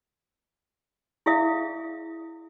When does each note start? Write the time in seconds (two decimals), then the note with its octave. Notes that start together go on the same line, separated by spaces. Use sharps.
1.26 E4 G#4 E5 F5 D#6